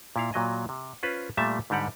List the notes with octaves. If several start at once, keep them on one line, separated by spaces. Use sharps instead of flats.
A#2 E4 F5
A#2 F#3 D#5 G#5
C3
C#4 F4 B4 C5
A#2 G3 A3 E5 A5
G#2 D3 G3 G4 F#5